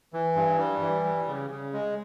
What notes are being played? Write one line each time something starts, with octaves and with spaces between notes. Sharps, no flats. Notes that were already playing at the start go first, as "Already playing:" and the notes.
E3
G2
G3
E3
G3
C#3
C#3
G#3